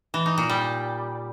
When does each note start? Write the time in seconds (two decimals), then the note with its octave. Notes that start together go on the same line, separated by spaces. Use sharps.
0.14 E3
0.26 D#4
0.38 A#2
0.49 G3